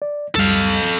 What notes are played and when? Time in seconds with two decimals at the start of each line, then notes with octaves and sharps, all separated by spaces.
0.02 D5
0.35 C#2 F#2 G3 A4 F5